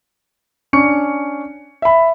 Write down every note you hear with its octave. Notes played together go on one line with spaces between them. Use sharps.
C#4 D4 C#6 C#7
E5 B5